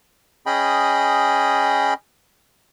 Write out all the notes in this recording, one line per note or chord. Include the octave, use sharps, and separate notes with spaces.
C#4 G#4 D#5 G5 B5